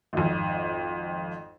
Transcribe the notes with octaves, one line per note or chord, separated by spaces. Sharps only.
G#1 F2